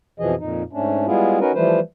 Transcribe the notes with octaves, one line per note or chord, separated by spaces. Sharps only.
F2 B2 E3 F3 G#4 D#5
F2 A#2 D#4
G#2 A3 C#4 D4
G3 G#3 B3 E4 F4 G#4
C#4 D#4 F#4 A#4 B4
E3 F3 G3 A3 B4 C5